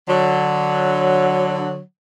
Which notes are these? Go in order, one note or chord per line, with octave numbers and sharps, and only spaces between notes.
D3 F#3